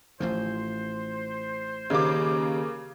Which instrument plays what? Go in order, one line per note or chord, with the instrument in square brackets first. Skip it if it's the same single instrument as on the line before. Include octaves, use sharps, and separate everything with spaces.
[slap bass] A1 A2 F3 [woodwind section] C5
[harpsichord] D#2 [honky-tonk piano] C#3 A#3 D6